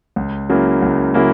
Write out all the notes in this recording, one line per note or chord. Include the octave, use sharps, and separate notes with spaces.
C#2
C#3 F#3 A#3 E4
C#2
C#3 F#3 A#3 E4